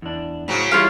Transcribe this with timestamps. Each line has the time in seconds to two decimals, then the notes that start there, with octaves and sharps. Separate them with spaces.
0.02 E2 D4
0.48 A2 C#3 F#3 C5
0.71 E3 G3 E4 F4 C#5 F5